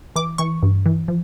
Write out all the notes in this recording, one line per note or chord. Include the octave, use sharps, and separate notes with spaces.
E3 D6
E3 C#6
G2
E3
F3